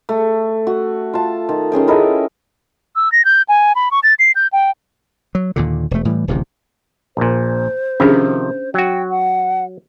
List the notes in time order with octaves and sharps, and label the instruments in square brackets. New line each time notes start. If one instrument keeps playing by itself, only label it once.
[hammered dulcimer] A3
F#4
F4 A5
D#3 F4
D#3 C#4 G#4 G5
E4 A4 A#4 D#5
[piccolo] E6
A#6
G6
G#5
B5
C#6
A6
C7
G6
G5
[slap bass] F#3
D#2 A#2 D3
E1 A3
A2 E3 G3
D1 A1 C3
[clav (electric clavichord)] A#1 A#2 [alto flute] C5
[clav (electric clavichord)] C3 D#3 F3 [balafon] C#4 D4 G#4
[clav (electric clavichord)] F#3 F#4 [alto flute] G5
[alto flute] F#5